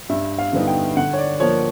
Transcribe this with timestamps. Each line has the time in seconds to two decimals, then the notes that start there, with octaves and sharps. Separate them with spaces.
0.09 G2 E5
0.38 F5
0.53 D3 G3 B3 D#4
0.67 G5
0.97 D3 F#5
1.13 C#5
1.18 D5
1.40 F3 A#3 C#5